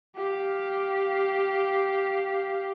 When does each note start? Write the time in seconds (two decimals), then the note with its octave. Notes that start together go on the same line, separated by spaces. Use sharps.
0.16 G4 F5